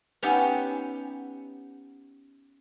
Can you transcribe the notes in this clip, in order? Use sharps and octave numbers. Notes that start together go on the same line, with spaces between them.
B3 C#4 D#4 G4 E5 F#5